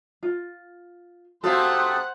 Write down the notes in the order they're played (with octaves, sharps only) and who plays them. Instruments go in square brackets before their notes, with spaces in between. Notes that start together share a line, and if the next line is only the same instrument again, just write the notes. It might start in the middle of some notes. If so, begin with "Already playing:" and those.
[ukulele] F4
[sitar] C3 A3 A4 [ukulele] F#4 F5 [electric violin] C5 F#5 [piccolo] D#6